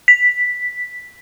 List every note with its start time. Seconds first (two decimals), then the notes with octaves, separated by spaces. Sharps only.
0.08 B6